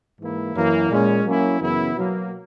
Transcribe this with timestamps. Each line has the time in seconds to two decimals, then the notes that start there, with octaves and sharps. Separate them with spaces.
0.19 G#2 E3 A#3 E4
0.54 F#2 E3 A#3
0.89 A#2 G#3 C#4
1.24 F#3 A#3 C#4 E4
1.59 F#2 C#3 E3 B3 E4
1.94 B2 F#3 A#3